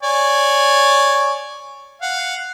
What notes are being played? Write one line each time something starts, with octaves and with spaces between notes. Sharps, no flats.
C#5 D5 G#5
F5 F#5